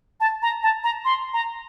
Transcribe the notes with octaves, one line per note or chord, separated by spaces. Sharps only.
A5
A#5
A5
A#5
C6
A#5